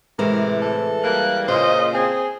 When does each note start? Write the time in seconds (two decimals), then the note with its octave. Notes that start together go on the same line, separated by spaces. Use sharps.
0.19 A2 C3 E3 G#3 A#4
0.62 A4
1.04 G3 A#3 F#6
1.48 A#2 C#3 F4 C5 D#5
1.94 C4 G#4